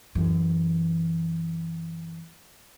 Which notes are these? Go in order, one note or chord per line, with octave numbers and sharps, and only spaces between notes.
F#2 E3